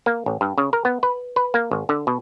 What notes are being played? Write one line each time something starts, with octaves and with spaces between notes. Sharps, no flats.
A#3
A1
G2
C#3
A#4
B3
B4
B4
A#3
G#1
D3
B2